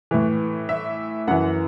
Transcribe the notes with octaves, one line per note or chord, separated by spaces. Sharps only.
A2 E3
E5
F#2 E3 F#5